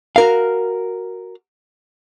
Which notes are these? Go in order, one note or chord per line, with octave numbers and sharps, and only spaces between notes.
F#4 A#4 F5